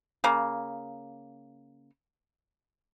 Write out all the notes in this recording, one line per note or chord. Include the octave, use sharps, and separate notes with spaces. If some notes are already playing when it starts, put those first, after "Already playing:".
C#3 A#3